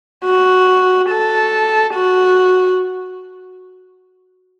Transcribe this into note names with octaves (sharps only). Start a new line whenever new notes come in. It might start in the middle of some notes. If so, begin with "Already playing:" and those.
F#4
A4
F#4